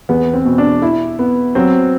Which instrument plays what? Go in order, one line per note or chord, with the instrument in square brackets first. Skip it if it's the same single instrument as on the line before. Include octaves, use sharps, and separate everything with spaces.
[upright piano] E2 [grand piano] B3
[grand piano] C4
[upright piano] B2
[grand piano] D4
[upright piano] E4
B3
[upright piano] F#3 [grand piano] C4